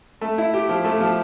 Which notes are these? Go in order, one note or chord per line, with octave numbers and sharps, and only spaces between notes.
A3
E4
G4
F3
A3
F3